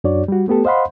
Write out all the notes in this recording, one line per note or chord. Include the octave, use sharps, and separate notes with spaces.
F#2 D4 F#4 C#5 D5
G3 F#4
A3 B3 G4 A4
C5 D#5 F5 F#5 B5 C6